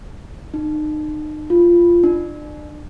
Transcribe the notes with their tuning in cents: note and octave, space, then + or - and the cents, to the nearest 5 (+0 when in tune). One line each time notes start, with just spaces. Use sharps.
D#4 -35
F4 -10
D4 +35